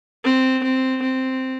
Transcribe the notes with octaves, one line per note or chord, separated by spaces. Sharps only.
C4
C4
C4